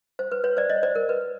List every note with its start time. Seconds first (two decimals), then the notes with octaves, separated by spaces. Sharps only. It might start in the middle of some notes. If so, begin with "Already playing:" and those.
0.19 C5
0.32 B4
0.44 B4 C#5
0.57 C5 D5
0.70 C#5 D#5
0.83 C5 D5
0.95 A#4
1.09 B4